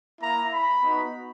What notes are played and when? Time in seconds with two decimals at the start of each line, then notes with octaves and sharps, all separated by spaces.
0.21 A#3 E4 A#5
0.52 B5
0.83 B3 D#4 F#4